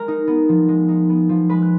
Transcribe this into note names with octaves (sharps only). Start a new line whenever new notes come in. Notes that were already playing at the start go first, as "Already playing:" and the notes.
Already playing: G#3 A#4 A#5
D#4
B3
F3
G#3
D#4
B3
F3
G#3 B4 B5
F#6